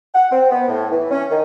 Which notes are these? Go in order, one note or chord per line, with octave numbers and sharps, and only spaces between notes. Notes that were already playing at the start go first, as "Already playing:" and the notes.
F#5
C4
B3
A2
E3
C#4
D#3